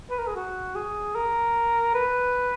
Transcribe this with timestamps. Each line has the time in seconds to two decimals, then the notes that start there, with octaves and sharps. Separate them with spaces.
0.10 B4
0.19 A#4
0.27 G#4
0.36 F#4
0.75 G#4
1.15 A#4
1.94 B4